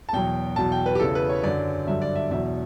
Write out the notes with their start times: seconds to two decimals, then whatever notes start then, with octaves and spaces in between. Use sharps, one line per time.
0.09 A5
0.13 E2 B2 F#3 G5
0.56 E2 B2 F#3 A5
0.72 G5
0.86 B4
0.95 G4
1.00 E2 C#3 E3 A4
1.15 B4
1.29 C#5
1.44 F#2 D3 F#3 D5
1.87 G2 D3 F#3 E5
2.02 D5
2.15 E5
2.30 E2 B2 F#3 E5